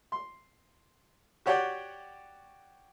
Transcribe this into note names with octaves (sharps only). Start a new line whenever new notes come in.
C6
F#4 G4 C#5 D5 F#5 G5